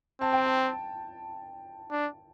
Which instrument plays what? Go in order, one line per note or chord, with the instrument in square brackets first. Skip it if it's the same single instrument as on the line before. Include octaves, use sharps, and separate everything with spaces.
[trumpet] C4 [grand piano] A5
[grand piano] G5
A5
[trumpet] D4